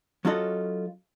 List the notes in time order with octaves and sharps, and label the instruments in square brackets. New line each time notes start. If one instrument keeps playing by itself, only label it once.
[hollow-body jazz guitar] F#3 C#4 F4 F#4 A4 D#5